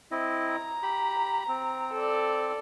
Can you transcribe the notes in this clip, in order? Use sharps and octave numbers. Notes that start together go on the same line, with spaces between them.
C4 E4 D#5
A#5
G4 B5
C4
A4 D5